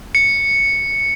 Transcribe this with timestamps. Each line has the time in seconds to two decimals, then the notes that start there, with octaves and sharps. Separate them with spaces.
0.15 C#7